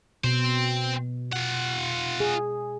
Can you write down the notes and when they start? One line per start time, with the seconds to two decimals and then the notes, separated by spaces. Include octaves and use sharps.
0.24 B2 C4 C5
1.33 F4 F#5
2.20 G#4